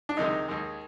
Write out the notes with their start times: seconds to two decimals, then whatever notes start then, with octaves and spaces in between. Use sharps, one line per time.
0.09 D4
0.17 C#2 C3 D#3 G#3 D#4
0.48 D#2 D#3 G#3